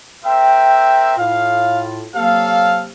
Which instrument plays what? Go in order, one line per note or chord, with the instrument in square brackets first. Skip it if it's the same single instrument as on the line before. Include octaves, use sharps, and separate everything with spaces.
[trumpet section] C4 A#4 E5 [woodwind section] G5
[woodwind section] A2 F4 [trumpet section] F5
[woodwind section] C3 F#3 A#3 [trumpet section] A4 F5